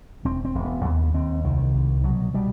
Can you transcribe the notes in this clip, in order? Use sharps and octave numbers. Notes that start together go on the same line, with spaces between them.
E1 C4
C4
E1
B3
D#2 B3
D#2 C4
C2 D#3
C2
B2 F#3
B2 G3